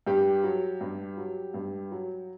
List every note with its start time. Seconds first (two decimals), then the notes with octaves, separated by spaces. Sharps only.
0.07 G2 G4
0.44 F#3
0.81 G2
1.17 F#3
1.54 G2
1.92 F#3